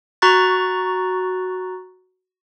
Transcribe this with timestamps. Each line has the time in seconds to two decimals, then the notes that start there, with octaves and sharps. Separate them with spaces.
0.22 F#4 A#5 C#6 F#6 A6